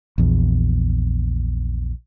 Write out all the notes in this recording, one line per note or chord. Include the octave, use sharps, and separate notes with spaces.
A#1 E2